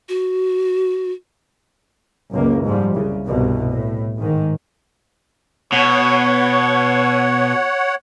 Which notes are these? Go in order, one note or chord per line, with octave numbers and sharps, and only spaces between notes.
F#4
F#1 C#2 A#3
G#2 F3 G3
C2 C#3
C2 G2 B2
A2
G#2 D#3
B2 C#5 F#5